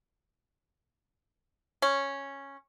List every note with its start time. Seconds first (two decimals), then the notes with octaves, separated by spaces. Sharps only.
1.82 C#4